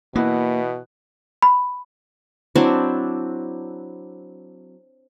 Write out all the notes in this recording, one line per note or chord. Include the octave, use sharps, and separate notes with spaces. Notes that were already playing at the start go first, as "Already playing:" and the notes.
B2 E3 A#3 B3 E4
B5
F#3 C4 D4 E4